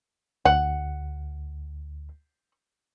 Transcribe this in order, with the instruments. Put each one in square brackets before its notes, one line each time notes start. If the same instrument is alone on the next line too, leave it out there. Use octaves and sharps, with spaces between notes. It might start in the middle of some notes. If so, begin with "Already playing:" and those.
[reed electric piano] D2 [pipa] F#5